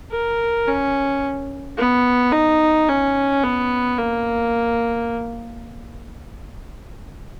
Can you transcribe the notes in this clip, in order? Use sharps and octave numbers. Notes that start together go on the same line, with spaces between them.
A#4
C#4
B3
D#4
C#4
B3
A#3